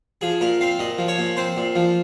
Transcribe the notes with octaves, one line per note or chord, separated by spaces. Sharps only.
F3 G#4
A#2 A#4
C4 F5
A#2 D#5
F3
C#5
A#2
C4 C5
A#2
F3